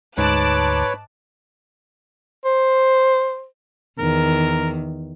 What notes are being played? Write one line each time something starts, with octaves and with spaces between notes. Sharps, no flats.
D2 G#2 B4 C#5 A5 D6 F#6
C5
E2 D#3 A#4